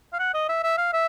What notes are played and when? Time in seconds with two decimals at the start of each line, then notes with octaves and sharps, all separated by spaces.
0.13 F5
0.19 F#5
0.34 D#5
0.49 E5
0.63 E5
0.78 F5
0.93 E5